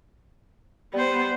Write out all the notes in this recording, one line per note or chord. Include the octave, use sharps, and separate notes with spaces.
G3 B3 C5